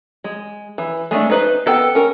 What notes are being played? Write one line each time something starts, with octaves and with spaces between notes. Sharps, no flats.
G#3
E3
G#3 A3 D4
D#4 B4 C5
B3 A4 G5
C#4 A#4